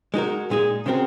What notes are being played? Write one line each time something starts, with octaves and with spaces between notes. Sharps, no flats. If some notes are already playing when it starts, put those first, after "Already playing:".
G#3 D#4 F#4 A#4
A#2 G#3 D#4 G#4
C#3 G#3 C4 F#4 A#4